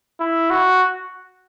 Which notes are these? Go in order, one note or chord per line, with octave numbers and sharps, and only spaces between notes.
E4
F#4